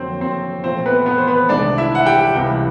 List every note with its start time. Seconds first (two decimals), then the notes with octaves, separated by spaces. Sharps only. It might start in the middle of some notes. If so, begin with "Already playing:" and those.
Already playing: F2 D3 F#3 A#3 C4 C5
0.21 C4 C5
0.64 A#2 F3 A3 C4 C5
0.86 B3 B4
1.06 B3 B4
1.18 C5
1.28 B3 B4
1.49 C2 C3 D#3 G#3 D4 D5
1.78 E4 E5
1.95 F#5
2.05 G4 G5
2.34 C#2 C3 E3 G3